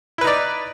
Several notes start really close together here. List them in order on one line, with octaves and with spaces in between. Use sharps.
E4 B4 D#4 D5